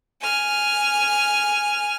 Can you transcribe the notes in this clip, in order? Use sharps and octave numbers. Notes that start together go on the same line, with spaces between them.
G#5 F6